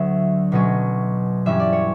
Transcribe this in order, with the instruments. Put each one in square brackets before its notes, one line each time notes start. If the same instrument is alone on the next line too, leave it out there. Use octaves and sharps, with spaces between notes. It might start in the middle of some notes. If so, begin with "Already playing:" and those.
Already playing: [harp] D2 D3 F#3 E5
B1 B2 F#3 C#4
G2 E3 G3 C#4 E5
D5
C#5